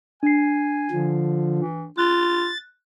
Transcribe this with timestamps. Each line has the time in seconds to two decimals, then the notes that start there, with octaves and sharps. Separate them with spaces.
0.23 D4 G#5 C7
0.91 D3 F3
1.59 E3
1.98 F4 F#6 A6